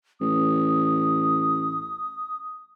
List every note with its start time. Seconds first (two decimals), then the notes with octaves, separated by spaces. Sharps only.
0.21 A1 D#6